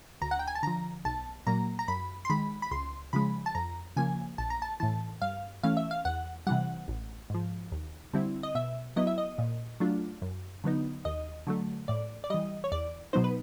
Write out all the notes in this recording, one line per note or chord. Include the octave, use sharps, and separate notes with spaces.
D2 A#5
F#5
G5
G#5
A5
D3 F3 A#5
B1 A5
A#2 F#3 A#3 A#5
A#5
F#2 B5
C6
D#3 G#3 B5
B5
C#2 C6
C#3 F3 G#3 B5
A5
F2 A#5
C#3 F3 A#3 G#5
A#1 A5
A#5
A5
A2 E3 A5
G2 F5
E3 A3 C#4 F5
E5
F5
E2 F#5
C3 E3 G3 F#5
A1
G#2 F3
D#2
D3 G3 C4 E4
D#5
B2 E5
F#3 B3 E4 D#5
E5
D#5
A#2
F#3 A3 D4 F4
F#2
D3 F#3 B3 D#4
D#2 D#5
D3 F#3 A3
A2 D5
D5
E3 G3 D#5
C#5
E2 D5
B2 F#3 B3 D#4 C5
B4